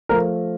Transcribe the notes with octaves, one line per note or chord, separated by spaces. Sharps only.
F3 A3 A#4